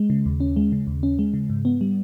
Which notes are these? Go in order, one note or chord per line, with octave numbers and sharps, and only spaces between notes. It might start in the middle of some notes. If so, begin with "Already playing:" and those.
Already playing: G#3
C#3
D#2
C#4
G#3
C#3
D#2
C#4
G#3
C#3
G#2
B3
G3